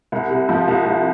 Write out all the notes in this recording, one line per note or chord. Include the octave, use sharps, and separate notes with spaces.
C2
C3
F3
C2
C2